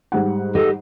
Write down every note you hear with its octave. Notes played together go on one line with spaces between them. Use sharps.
G#2 G3 F#5
G4 A4 C5 D#5